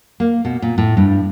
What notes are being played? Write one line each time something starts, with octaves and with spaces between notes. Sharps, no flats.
A#3
B2
A#2
A2
G2